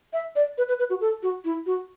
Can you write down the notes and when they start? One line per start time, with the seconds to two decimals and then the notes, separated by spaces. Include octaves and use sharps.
0.13 E5
0.36 D5
0.58 B4
0.68 B4
0.79 B4
0.90 F#4
1.01 A4
1.23 F#4
1.45 E4
1.66 F#4